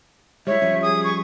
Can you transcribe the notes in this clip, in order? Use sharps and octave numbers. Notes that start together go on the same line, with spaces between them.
G3 G#3 E4 C#5 E5
F3 G3 C#4
G#4 D#6
C#6